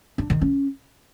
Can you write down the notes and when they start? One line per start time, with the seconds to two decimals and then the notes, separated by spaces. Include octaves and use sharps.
0.18 D4
0.30 D#3
0.41 C#4